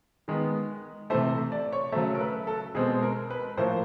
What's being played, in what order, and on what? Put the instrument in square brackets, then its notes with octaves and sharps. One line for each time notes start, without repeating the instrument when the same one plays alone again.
[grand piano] D#3 G#3 B3
C3 E3 A3 C5
D5
C#5
C#3 F#3 A3 C5
A#4
B4
A4
B2 G#3 C4 G#4
A#4
B4
A2 F3 A#3 C5